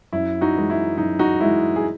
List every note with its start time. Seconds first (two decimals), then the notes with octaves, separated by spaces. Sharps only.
0.13 F#2 E4
0.41 D#4 F#4
0.56 E3 G#3
0.70 E4
0.98 F#2 D#4
1.19 D#4 F#4
1.40 E3 G#3 E4
1.76 G#4